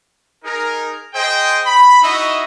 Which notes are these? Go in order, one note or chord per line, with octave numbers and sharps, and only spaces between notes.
D#4 G#4 A#4
G#4 C5 D#5 G5
B5
D#4 E4 F#4 D#5 E5